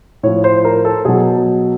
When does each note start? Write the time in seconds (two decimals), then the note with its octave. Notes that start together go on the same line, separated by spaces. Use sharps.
0.23 A2 F3 C#5
0.44 C5
0.65 A#4
0.85 A4
1.05 B2 F#3 G#4